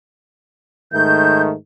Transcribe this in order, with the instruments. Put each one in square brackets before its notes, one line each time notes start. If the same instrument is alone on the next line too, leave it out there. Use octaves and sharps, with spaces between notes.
[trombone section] G#2 D#3 A3 [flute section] G6